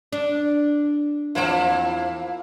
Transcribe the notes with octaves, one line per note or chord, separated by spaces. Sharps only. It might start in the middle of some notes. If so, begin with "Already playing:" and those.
D4
E2 F3 A#3 C4 E4